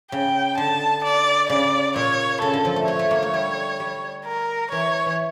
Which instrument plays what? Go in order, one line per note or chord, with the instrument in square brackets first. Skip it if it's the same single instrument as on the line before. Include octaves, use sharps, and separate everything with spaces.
[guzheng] C#3 [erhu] G5
[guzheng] D3 [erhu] A5
[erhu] D5
[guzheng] C#3 [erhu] D5
[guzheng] A#2 [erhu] C#5
[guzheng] C#3 [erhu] A4
[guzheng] D3
F3
A3
[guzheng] A3 [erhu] C#5
[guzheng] A3
A#3
A3
G3
G3
[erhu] A#4
[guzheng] E3 [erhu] C#5
[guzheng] E3